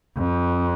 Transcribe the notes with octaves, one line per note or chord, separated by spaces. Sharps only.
F2